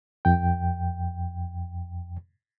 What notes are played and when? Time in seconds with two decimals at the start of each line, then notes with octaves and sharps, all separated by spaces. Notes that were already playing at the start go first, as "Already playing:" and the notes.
0.25 F2 G5